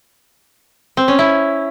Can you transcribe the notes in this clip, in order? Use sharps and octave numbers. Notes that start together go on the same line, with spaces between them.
C4
C#4
E4